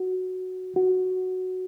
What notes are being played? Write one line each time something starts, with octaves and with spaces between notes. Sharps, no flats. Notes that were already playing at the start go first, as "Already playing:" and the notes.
Already playing: F#4
F#4